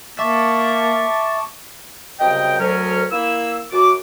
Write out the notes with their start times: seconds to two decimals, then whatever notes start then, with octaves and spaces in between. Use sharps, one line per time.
0.19 A#3 E5 A5 C#6 D6
2.19 C2 F#2 C#3 D#5 G5
2.58 D2 F#3 C#4 A#4
3.11 A#3 E4 E6
3.71 F#2 F#4 D6